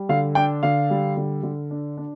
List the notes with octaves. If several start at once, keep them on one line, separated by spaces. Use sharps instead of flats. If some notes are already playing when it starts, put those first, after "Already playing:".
Already playing: G3
D3 F5
D4 G5
D3 F5
G3
D3
D3
D4
D4